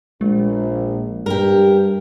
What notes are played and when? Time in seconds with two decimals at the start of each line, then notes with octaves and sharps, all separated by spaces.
0.21 A#1 G#3
1.26 G2 G4 A#4